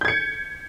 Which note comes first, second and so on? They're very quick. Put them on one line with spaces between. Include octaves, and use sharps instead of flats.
G6 G#6 C#7